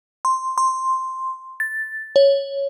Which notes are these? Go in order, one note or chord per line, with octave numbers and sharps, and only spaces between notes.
C6
C6
A6
C#5